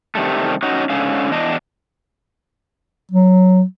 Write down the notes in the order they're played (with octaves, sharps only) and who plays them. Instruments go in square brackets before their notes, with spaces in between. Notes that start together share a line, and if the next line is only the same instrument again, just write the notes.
[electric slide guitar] C3 D#3 G3 A3
C#4 D#4 F#4
G#2 D3 C#4 F5
E2 D4 D#5
[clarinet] F#3